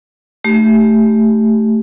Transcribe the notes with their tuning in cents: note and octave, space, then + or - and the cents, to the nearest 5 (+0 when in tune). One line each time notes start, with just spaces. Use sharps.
A3 +0 D#4 -35 G4 +0